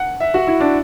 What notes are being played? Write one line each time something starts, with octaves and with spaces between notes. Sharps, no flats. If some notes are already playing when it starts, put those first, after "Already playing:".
Already playing: F#5
E5
F#4
E4
D4